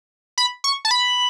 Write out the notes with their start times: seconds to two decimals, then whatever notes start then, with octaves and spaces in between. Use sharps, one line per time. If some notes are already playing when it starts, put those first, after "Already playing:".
0.38 B5
0.64 C#6
0.85 A5
0.91 B5